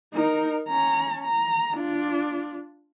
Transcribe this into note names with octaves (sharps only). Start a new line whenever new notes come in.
D#4 A#4
C#4 A#5
A#5
D4 F4